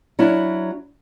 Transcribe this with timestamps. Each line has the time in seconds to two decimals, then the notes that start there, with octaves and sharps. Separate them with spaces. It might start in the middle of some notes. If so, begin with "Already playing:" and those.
0.19 F#3 C#4 D4 E4